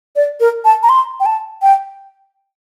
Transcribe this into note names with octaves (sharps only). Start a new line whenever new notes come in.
D5
A#4
A5
A#5
C6
G5
A5
G5